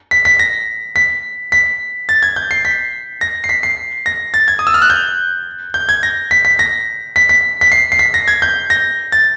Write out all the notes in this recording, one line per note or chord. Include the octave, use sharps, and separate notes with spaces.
B6
B6
A#6
B6
B6
A6
G#6
G6
C7
B6
A#6
C7
B6
C7
A#6
A6
G#6
D#6
E6
F6
F#6
G6
G6
G#6
A#6
B6
B6
A#6
B6
B6
B6
C7
C7
B6
A#6
G#6
G6
A#6
A6